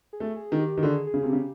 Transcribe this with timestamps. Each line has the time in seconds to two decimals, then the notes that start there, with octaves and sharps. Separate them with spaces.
0.13 G#4
0.20 A3
0.36 G#4
0.52 D#3
0.60 G4
0.77 D#3
0.83 D3 G#4
1.06 G#4
1.14 C#3
1.23 C3
1.30 C#3 G4